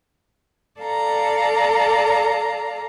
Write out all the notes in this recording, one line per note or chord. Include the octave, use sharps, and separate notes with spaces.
A4 D5 F5 A#5